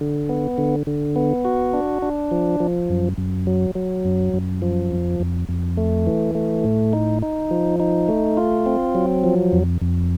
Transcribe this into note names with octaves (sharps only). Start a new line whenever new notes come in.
D3
B3
D3
D3
B3
F#4
D4
D4
F3
F3
F#2
F#2
F#3
F#3
F#2
F#2
F3
F2
F2
F2
A3
E3
A3
A2
D#4
D#4
F3
D#4
A3
F4
C4
F#3
F3
F2
F2